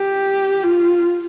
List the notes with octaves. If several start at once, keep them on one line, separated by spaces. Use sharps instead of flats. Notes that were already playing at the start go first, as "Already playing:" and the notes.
Already playing: G4
F4